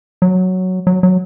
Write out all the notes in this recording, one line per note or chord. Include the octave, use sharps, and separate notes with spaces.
F#3
F#3
F#3